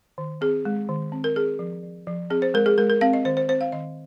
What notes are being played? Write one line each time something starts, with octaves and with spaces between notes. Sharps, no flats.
D#3
C4 G#4
G#3
D#3
C4
A#4
C4 G#4
F3
F3
F3
C4 G#4
C5
G#3 A#4
G#4
G#3 A#4
A#4
C4 F5
D#5
D#3 C5
C5
C4 C5
F5
D#3 D#5